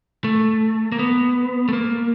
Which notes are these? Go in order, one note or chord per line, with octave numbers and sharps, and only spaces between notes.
A3
A#3
B3
A3
A#3